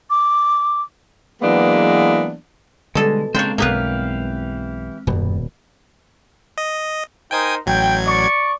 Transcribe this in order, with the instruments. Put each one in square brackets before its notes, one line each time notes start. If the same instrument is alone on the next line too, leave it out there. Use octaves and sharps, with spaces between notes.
[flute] D6
[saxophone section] E3 F#3 G#3 A#3 B3 D4
[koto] B2 A4 [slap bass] D3 G3 [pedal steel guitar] G#3
[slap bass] C#3 [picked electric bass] G#3 C4 [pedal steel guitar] A#3 D4 C5 [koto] C#5 G5
[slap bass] B1 G2 [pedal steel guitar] E3 G4 F5 [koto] A#3 B3 B4
[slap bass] D#1 B2 [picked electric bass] F#2 G3
[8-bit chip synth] D#5
[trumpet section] D#4 A#4 C5 [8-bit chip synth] G5 G#5 D#6
[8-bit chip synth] A1 F#3 G#6 [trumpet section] G5
[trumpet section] D5 C#6